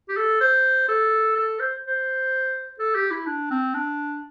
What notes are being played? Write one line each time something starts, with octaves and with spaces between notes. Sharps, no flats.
G4
A4
C5
A4
A4
C5
C5
A4
G4
E4
D4
C4
D4